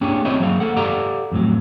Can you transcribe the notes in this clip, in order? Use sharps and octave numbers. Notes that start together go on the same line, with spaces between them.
A#3 C#4 D4 G4 G#4 C#5
C4 E4 F#4 C5 C#5 D#5
F#3 A#3 G#4 F5
A#3 A4 F#5
G4 A4 D5 F5 F#5 A#5
F2 A2 E3 F#3